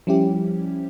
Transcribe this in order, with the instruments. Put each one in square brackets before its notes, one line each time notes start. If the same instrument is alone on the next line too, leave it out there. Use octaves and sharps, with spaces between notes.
[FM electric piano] F3 G3 C#4 E4 G4